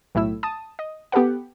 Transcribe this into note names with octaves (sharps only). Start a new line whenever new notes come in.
B1 A2 E4 E6
A5 D#6
D#5
B3 G4 A4 B4 F#5